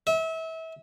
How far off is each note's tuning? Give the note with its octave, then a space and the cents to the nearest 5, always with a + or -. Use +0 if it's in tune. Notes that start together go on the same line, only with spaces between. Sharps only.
E5 -30